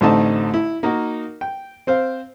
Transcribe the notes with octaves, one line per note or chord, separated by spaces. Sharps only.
A1 D3 A3 C4 D#4 A5
E4
A#3 D#4 F#4 A#4
G5
C4 C5 F5